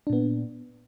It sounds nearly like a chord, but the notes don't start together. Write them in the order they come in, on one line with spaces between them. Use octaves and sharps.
D4 A#2 B3